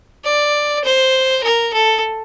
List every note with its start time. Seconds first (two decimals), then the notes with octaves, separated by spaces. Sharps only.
0.24 D5
0.84 C5
1.43 A#4
1.73 A4